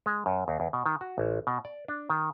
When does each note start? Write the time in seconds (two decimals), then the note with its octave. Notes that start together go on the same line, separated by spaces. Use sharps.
0.06 G#3
0.26 F#2
0.48 D#2
0.60 E2
0.73 B2
0.86 D#3
1.01 F#4
1.18 A1
1.47 B2
1.65 D5
1.88 D4
2.10 D#3